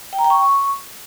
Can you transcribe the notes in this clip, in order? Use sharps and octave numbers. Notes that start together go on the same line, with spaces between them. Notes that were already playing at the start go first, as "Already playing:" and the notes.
G5
A#5
G5
C#6